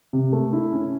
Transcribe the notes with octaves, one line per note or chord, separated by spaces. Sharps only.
C3
A3
E4
C#4